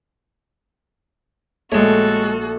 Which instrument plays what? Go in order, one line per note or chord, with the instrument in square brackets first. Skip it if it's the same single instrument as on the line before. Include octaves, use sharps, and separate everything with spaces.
[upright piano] A#1 A3 [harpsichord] G#3 C#5 [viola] F#4 A4